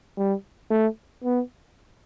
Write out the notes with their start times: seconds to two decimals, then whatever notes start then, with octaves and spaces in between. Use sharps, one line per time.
0.17 G3
0.71 A3
1.24 B3